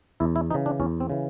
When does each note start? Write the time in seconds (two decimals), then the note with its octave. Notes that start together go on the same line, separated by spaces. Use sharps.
0.20 E2 E4
0.36 E4
0.51 C#3 E3 D#4
0.66 D4
0.80 E2 C#4
1.00 C4
1.10 C#3 E3